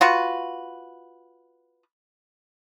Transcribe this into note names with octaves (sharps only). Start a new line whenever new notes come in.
F4 F#4 B4